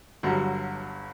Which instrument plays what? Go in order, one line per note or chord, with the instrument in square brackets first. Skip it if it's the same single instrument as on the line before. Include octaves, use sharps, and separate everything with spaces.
[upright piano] G1 G2 D3 F#3 G3 F#4